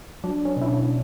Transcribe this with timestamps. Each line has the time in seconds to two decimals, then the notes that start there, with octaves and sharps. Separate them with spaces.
0.24 F#3 D4
0.45 C#4
0.56 B2
0.61 E4
0.68 D4